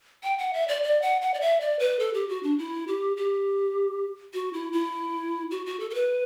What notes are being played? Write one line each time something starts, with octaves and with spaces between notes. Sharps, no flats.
G5
F#5
E5
D5
D5
F#5
F#5
D5
E5
D5
B4
A4
G4
F#4
D4
E4
G4
G4
F#4
E4
E4
F#4
F#4
A4
A4
B4